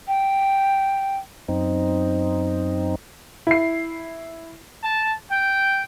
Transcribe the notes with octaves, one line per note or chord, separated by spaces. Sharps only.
G5
F#2 C4 D#4
E4 C7
A5
G5